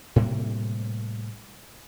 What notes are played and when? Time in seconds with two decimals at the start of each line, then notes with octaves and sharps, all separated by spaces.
0.16 A2 C3 G3 A#3